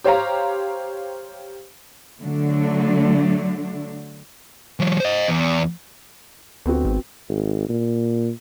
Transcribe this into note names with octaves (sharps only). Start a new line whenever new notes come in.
G4 C5 C#5 F5 A#5
D3 F#3 A3 D4
E3 F#3
C5 D#5
E2
D2 B3 C4 F#4
G#1
G#1
A#2